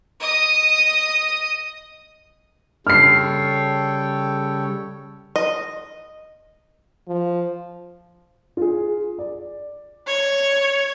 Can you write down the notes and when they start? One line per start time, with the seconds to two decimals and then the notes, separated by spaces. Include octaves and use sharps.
0.20 D#5 D#6
2.87 C#3 G3 A4 C#5 G5 F6 C7
5.36 D#5
7.08 F3
8.57 F4 G#4
9.18 D5
10.07 C#5